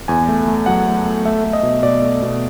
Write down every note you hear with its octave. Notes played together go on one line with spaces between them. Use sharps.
E2 G#5
A3
A3
F#3 F#5
A3
A3
A3 E5
A3
D#5
B2
B2 D5
A3
B2